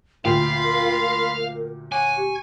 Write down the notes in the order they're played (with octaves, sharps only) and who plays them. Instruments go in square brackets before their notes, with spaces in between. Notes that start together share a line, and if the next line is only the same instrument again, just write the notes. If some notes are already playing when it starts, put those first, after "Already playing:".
[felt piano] D2 A#2 G5 [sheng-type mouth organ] F4 B5 C6 [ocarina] A#4 [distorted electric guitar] F5
[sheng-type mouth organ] C#5 F#5 D6 [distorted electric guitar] G#5
[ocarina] G4 [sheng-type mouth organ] C#6